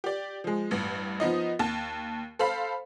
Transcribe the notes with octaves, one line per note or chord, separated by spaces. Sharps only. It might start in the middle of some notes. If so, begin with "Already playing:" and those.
G4 D5
F3 G#3
A1 G2
F3 B3 D#4 D#5
D#2 A5
A4 C5 F5 B5